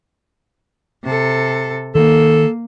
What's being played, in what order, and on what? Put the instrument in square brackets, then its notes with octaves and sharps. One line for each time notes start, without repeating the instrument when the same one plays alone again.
[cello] C3 A4
[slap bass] D#3 [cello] A#3 [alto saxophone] A4